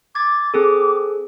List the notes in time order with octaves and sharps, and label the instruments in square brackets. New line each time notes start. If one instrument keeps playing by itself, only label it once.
[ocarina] D6 [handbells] G#6 A6
[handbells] C4 G#4 A4